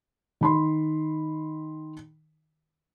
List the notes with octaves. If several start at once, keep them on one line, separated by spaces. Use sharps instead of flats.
D#3 B5 C6